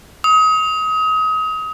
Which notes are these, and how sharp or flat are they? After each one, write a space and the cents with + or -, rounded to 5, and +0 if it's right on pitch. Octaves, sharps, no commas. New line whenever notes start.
D#6 +30